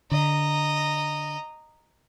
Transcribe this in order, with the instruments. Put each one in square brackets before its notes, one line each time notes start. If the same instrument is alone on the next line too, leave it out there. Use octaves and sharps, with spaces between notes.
[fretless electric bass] D3 [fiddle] D#5 A#5